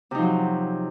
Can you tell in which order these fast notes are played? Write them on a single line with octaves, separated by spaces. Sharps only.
C3 D#4 F3 F#3